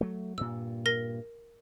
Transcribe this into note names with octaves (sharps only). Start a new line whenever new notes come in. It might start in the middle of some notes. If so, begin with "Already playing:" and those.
F#3 A3
G2 A#2 E6
A#4 A#6